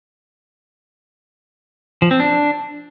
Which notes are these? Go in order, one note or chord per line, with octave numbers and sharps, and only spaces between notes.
F3
C4
D4